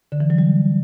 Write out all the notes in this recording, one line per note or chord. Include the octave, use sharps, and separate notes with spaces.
D3
E3
F#3
G3